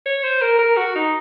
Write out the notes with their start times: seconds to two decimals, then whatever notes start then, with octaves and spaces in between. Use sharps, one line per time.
0.06 C#5
0.23 C5
0.41 A#4
0.59 A#4
0.77 F#4
0.95 D#4